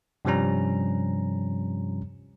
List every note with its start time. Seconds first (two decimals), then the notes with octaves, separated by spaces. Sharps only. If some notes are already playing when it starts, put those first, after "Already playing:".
0.25 G2 C3 F3 G3 C#4 A#5